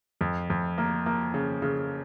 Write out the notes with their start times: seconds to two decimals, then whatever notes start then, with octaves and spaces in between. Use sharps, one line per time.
0.21 F2
0.50 F2
0.78 A#3
1.06 A#3
1.34 C#3
1.62 C#3